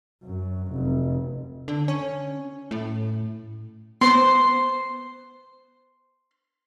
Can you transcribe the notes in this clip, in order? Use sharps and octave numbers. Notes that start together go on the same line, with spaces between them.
F#2
F1
D3
C#4
A2
B3 C5 C6